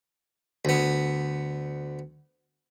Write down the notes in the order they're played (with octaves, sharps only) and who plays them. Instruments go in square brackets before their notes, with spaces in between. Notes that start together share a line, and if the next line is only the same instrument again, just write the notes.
[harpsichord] D2 B3